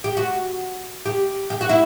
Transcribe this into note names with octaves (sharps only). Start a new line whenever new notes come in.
G4
F#4
G4
G4
F#4
E4